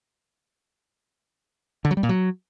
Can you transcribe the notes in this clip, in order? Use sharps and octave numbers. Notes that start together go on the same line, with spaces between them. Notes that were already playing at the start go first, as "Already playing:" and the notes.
D3
F#3
G3
A#2
F#3